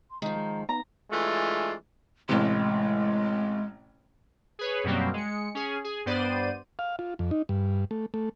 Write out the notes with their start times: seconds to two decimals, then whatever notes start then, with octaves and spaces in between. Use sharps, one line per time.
0.10 C6
0.22 D#3 F3 G#3 A#5
0.36 G#3
0.69 B3 D#4 A#5
1.10 E3 G#3 A3 D4 F4
2.29 A1 A2 C3 G#3
4.59 G#4 B4 C#5
4.84 F#2 B2 F#3 G3 A#3 C4
5.14 G#3 C#7
5.55 C#4 G#4
5.84 G#4
6.06 G2 B3 C5 D5 D#7
6.79 F5
6.99 F4
7.19 F2
7.31 D#4
7.49 G2
7.91 A3
8.14 A3